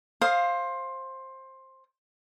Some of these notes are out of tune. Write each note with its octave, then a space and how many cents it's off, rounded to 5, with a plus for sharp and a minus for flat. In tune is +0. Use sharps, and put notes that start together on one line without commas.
C5 +15 F5 +0 D#6 +0